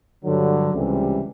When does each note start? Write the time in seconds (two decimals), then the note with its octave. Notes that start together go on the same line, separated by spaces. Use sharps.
0.24 G2 D3 F#3
0.73 C#2 C3 E3 G3